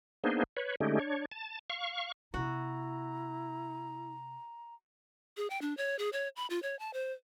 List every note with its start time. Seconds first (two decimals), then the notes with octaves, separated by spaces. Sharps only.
0.24 A#3 B3 D4 D#4 G#4 C5
0.57 B4 C#5
0.80 D3 G#3 A3 C#4 D#4 G4
0.99 D4 C#5
1.32 A5
1.70 F5 C#6
2.34 C3 B3 E4 F#4 A#5
5.37 G#4
5.50 G5
5.62 D4
5.77 C#5
5.99 G#4
6.13 C#5
6.36 B5
6.50 F4
6.62 C#5
6.79 A5
6.93 C5